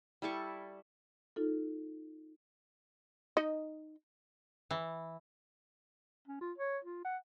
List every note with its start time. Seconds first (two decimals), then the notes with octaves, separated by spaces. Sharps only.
0.22 G3 E4 A4 C#6
1.36 D#4 F4 A4
3.37 D#4 D#5
4.71 E3
6.28 C#4
6.41 F4
6.58 C#5
6.84 F4
7.05 F#5